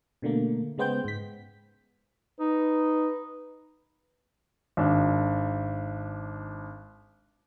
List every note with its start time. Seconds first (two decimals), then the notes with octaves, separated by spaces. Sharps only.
0.22 B2 D3 A3 A#3
0.78 C#3 G#3 B3 C5 G5 G6
1.05 G#2 B6
2.40 D#4 B4
4.77 G#1 D4